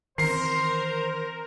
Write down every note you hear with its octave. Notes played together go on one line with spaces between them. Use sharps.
D#3 E3 C4 A#4 C5 C7